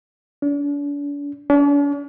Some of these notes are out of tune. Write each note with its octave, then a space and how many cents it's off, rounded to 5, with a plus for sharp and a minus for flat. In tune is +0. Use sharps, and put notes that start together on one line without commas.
D4 -40
D4 -45